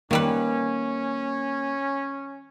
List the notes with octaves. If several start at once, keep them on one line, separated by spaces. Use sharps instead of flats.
D#3 G3 A#3 C#4 B4